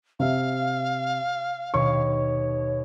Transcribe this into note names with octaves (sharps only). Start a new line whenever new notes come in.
C3 E5 F5
D#2 B2 C#5 C#6